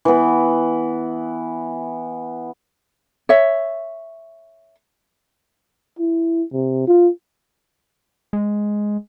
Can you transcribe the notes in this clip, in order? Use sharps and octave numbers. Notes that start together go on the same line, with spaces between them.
E3 B3
C#5 E5
E4
C3
F4
G#3